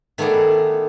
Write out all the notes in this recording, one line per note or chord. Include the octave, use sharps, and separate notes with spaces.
D#3 A3 B3 G#4 D5